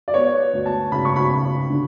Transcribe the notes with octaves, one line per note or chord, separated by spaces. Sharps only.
D5
B3 C#5
D2
A5
C#3 B5
C#6
B5
C#3
D3